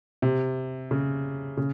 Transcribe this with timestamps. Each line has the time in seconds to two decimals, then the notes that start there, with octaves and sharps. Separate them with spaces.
0.22 C3
0.91 C#3
1.57 C#3